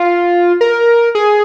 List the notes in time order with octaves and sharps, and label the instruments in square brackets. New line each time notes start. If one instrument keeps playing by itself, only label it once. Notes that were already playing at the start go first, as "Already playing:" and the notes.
Already playing: [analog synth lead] F4
A#4
G#4